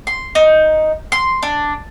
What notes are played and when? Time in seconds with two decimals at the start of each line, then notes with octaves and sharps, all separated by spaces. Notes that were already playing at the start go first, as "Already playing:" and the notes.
0.07 C6
0.35 D#4
1.12 C6
1.43 D4